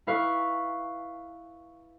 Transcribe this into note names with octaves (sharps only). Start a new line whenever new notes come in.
E4 B4 F5 C#6